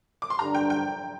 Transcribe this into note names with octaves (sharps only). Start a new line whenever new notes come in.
D6
C6
G2 D3 G3 D4 A#5
G5
G5